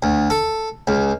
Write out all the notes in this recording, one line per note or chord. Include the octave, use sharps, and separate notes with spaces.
D2
A4
C#2